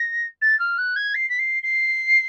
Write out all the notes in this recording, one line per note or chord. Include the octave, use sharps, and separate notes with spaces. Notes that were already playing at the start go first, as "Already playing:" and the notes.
Already playing: A#6
A6
F6
F#6
G#6
C7
B6
C7
C7